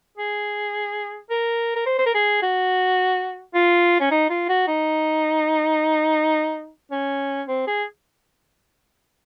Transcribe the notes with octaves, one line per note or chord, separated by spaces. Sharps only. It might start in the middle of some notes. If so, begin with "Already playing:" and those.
G#4
A#4
A#4
C5
C5
A#4
G#4
F#4
F4
C#4
D#4
F4
F#4
D#4
C#4
C4
G#4